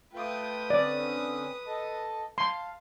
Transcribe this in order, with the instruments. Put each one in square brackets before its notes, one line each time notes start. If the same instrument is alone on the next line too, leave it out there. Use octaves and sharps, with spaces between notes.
[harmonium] A3 F4 G5 [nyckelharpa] B4 D#6
[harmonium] D3 C4 C#4 [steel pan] D5
[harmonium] A4 D#5 A5
[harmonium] F5 A5 [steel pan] C6